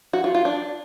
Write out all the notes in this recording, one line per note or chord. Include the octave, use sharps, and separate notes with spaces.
F#4
F4
F4
D4